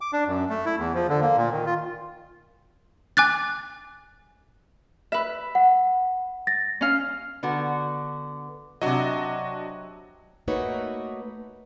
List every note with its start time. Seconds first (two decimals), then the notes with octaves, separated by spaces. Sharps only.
0.01 D6
0.13 D4
0.27 F#2
0.50 A3
0.66 E4
0.79 E2
0.94 F3
1.09 D3
1.21 A#3
1.36 A#2
1.52 D#3
1.66 F4
3.17 G#5 D6 F#6 A6
5.12 B4 E5
5.55 F#5
6.47 A6 A#6
6.81 C#4 F5
7.43 D3 B3 F#4
8.82 C3 F#3 D4 F#4 D#5
10.48 A3 A#3 D#4 F#4 B4 C#5